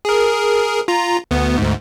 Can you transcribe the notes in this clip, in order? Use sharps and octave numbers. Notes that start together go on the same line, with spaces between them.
G#4 A#4
F4 A#5
D2 B3
D2 G#2